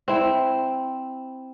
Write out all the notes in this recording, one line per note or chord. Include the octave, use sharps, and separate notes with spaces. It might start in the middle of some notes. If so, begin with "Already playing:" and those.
C4 E4